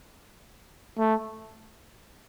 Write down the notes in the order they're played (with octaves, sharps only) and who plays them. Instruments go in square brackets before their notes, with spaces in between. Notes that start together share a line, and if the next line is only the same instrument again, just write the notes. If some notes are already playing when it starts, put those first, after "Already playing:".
[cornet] A3